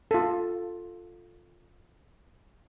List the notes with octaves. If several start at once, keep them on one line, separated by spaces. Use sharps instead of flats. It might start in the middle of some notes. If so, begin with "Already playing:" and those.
F4 A4